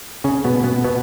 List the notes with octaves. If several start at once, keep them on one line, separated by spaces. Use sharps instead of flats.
C#3 C#4
B2 B3
B2 B3
B2 B3